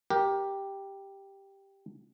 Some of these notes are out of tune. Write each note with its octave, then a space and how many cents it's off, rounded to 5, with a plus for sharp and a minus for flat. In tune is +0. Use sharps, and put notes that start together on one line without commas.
G4 +0 A#4 +20